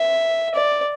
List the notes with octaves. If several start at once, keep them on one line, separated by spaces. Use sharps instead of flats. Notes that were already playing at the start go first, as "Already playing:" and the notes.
Already playing: E5
D5